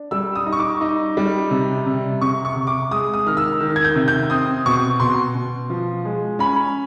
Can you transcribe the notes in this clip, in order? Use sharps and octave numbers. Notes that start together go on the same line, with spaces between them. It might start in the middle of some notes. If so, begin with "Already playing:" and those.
Already playing: D4
G3 E6
D#6
D#4
C#6
D6
D#4
G3
C3
C3
C3 C#6
C#6
C3
D6
G#3 D#6
D#6
D#3 F6
E6
D#3
G#6
G6
C3
G6
C4 D#6
B2 C#6
B2 C6
B2
F3
G#3
C#4 B5